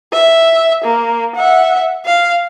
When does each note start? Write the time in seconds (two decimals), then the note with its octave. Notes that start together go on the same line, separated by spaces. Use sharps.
0.13 E5
0.84 A#3
1.36 E5 F#5
2.06 F5